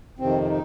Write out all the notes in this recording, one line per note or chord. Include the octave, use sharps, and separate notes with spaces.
F2 C3 D#3 C4
C4
D#4